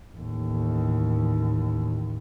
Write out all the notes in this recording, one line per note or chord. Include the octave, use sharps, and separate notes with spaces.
A1 D#2